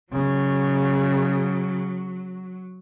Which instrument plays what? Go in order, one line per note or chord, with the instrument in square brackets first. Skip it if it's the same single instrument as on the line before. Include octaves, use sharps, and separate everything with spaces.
[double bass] C#3 [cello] F#3